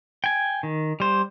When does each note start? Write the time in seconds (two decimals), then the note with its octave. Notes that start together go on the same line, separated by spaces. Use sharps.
0.24 G5 G#5
0.63 D#3
1.00 G3 C5